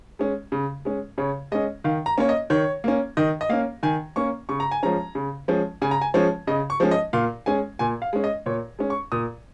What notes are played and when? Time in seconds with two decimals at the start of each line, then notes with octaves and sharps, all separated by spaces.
0.19 G#3 C#4
0.52 C#3
0.85 G#3 C#4
1.18 C#3 C#5
1.52 G#3 C#4 D#5
1.84 D#3 F5
2.06 A#5
2.18 A#3 C#4 C#5
2.29 D#5
2.50 D#3 C#5
2.84 A#3 C#4
3.17 D#3 D#5
3.41 D#5
3.49 A#3 C#4 F5
3.83 D#3 G#5
4.16 A#3 C#4 C#6
4.49 C#3 C#6
4.60 A#5
4.71 G#5
4.83 F3 G#3 C#4 A#5
5.15 C#3
5.48 F3 G#3 C#4
5.82 C#3 G#5
5.91 A#5
6.01 G#5
6.14 F3 G#3 C#4 C#5
6.47 C#3 D#5
6.70 C#6
6.80 F3 G#3 C#4
6.91 D#5
7.13 A#2 F5
7.46 G#3 C#4 G#5
7.79 A#2 G#5
8.02 F5
8.13 G#3 C#4
8.24 D#5
8.46 A#2 C#5
8.79 G#3 C#4
8.90 C#6
9.12 A#2 D#6